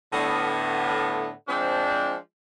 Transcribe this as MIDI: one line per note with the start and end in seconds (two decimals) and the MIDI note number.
0.13 1.30 45
0.13 1.30 50
0.13 1.30 59
1.48 2.15 53
1.48 2.15 56
1.48 2.15 60
1.48 2.15 62